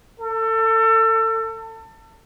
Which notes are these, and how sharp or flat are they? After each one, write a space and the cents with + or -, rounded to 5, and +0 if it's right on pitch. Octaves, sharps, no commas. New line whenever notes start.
A4 +30